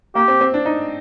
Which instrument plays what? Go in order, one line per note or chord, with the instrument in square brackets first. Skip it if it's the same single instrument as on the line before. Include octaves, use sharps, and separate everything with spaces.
[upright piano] A#3 [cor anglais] G4
[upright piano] C4
C4
D4
D#4